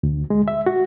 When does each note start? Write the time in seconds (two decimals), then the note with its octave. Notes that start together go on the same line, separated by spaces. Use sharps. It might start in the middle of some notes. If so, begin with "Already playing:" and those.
0.03 D2
0.30 G#3
0.48 E5
0.66 F#4